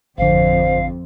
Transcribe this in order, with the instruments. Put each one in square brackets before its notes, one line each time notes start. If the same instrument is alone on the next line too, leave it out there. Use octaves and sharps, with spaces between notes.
[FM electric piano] G#1 D3 [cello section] F2 [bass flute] C5 [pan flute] F5